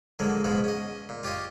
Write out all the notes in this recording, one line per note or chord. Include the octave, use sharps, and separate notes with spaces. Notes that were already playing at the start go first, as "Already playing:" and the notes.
D3 F3 F#3 G#3 A#3
G#2 B2 F3 G#3 F#4
C#4 D#5
A#2
F4 G4 C#5 D#5 F5